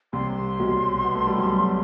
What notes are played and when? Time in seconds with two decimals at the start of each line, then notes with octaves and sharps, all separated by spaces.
0.13 C2 C3 C6
0.59 B1 B2
1.04 B3
1.15 A3
1.27 G3
1.38 F#2 F#3